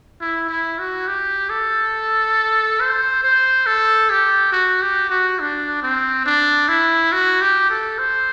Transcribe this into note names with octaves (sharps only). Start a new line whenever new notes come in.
E4
E4
F#4
G4
A4
C5
C5
A4
G4
F#4
G4
F#4
D4
C4
D4
E4
F#4
G4
A4
C5